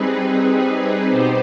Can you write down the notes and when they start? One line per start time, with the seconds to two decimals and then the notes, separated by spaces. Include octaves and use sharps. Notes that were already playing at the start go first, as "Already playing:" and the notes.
Already playing: G3 C4 D#4 G#4 B4
1.06 B2 B3 D#4 G4 C5